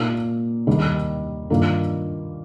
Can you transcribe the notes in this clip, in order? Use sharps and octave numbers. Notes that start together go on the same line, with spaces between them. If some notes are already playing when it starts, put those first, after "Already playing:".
Already playing: A#2 A#3 D#4
D#2 D#3 G3
G2 D#3 A#3 F4